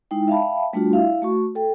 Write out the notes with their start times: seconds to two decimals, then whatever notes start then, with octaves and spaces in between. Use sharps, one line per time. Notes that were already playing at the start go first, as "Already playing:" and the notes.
0.11 G#3 D#4 E4 G5
0.28 E5 F5 G5 A5 B5
0.73 G3 A3 D4 F4 F#4
0.93 E4 E5 F5
1.22 A3 F#4 C#6
1.55 A4 G5